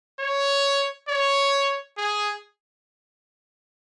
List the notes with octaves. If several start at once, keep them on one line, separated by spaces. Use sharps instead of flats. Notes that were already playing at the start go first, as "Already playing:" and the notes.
C#5
C#5
G#4